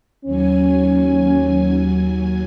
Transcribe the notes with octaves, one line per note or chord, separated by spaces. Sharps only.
D#2 F#3 C#4 G#5